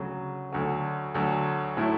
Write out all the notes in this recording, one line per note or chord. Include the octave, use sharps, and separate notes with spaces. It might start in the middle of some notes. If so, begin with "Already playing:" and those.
Already playing: D2 C#3 F#3
D2 D3 F#3
D2 D3 F#3
A2 F#3 A3 E4